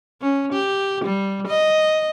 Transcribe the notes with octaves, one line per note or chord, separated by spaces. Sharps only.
C#4
G4
G3
D#5